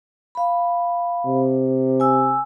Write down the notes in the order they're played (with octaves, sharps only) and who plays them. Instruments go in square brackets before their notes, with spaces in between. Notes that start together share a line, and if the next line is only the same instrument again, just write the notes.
[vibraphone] F5 B5
[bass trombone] C3
[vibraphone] G#5 E6